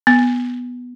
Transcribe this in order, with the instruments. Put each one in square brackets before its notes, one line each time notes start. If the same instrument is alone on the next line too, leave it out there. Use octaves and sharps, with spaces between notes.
[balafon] B3